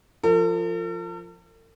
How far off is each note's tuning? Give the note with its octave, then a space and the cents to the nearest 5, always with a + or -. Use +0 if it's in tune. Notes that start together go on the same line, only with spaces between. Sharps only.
F3 -10 A4 +45